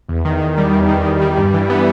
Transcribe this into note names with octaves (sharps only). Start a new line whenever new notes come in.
E2
D#3
E2
G3
E2
D#3
E2
G3
G2
E3
B3